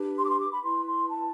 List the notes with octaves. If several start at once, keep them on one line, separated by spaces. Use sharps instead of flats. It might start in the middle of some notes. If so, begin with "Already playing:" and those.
Already playing: D4 G4 B4
C6
D6
C6
D6
B5
E4 B4 C6
C6
A5